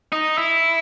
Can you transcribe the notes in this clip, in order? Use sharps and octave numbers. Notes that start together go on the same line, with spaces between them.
D#4
E4